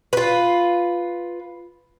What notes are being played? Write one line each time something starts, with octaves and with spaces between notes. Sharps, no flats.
F4 B4